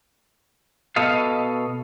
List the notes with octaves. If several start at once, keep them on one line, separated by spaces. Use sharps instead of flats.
B2 A4 D#5 F5